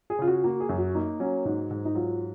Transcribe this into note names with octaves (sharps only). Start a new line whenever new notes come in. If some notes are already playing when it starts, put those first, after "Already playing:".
G#4
C#3 F4
F#4
A#3 F#4
G#4
F#2
F#4
A#3 D#4
F#3 C#4
G#2 D#4
G#2
D#4
F#3 F4